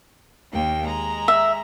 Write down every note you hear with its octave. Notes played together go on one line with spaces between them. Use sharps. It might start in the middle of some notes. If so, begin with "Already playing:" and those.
D#2 A#3 G5
G#3 A#5
E5